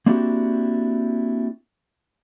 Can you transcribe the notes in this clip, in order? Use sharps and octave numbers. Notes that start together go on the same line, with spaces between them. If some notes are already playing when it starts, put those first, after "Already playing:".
A#3 C4 D4 E4 F#4 G4